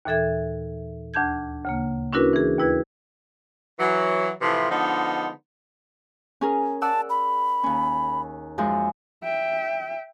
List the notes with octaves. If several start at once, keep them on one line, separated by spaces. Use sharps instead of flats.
D#2 A#2 E3 A4 E5 G#6
D2 D4 A5 G6 G#6
D2 C#3 A#3
C#4 D4 E4 F#4 A#4 B4
E3 G#4
D#2 E4 B4 G#6
E3 F#3
A2 C3 E3 F3
D3 F3 G#3 B3 D#4
C#4 G#4 A#4
D5 F#5 A5 E6
B5
D#2 C#4
F#2 F3 G#3
E5 G5